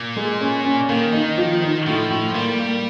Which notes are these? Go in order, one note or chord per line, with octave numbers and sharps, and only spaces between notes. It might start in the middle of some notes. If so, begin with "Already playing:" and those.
Already playing: A#2
G#3
C#4
C#4
D#3 A#3
D#4
F3
D#4
A2 F3
A2
G3 A#3
A#3